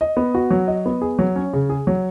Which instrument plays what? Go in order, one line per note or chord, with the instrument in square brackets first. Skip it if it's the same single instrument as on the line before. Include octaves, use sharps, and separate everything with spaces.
[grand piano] D#5
B3
F#4
F#3
D#5
B3
G#4
F#3
C#4
C#3
G#4
F#3